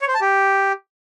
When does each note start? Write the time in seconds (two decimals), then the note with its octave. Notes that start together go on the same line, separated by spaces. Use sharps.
0.01 C#5
0.08 C5
0.14 A5
0.21 G4